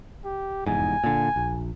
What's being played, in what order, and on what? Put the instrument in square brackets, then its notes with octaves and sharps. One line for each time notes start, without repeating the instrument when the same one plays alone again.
[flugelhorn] G4
[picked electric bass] F1 E2 G#2 [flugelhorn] G#5
[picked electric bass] A#2 D3
A#1